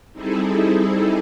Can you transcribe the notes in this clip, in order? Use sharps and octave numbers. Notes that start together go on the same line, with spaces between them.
G3 C4 D#4 E4 G#4 A4